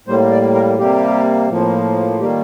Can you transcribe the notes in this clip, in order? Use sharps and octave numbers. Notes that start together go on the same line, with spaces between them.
A2 G3 A#3 C5
D5
A#4
C3 G3 A#3 G4
A2 F3 A#3
D#3 G3 A#3 G4